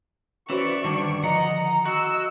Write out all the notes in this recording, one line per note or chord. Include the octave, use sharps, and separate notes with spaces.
E3 C#4 F#4 C5 D5 C#6
G2 D3 D#3
D3 D#3 F3 D#5 F#5 A#5
A#5
F#4 D#5 E6